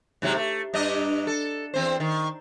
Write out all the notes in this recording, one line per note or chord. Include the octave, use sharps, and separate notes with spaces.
G#2 C3 F#3
A3
G2 D4 D#5
A4
E2 C4 C5
D#3